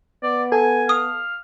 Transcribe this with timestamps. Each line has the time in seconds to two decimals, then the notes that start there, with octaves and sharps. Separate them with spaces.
0.23 B3 D5
0.52 A4 G#5
0.89 F5 D#6